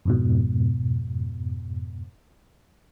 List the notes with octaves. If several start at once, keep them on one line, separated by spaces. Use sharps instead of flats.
F2 G#2 B2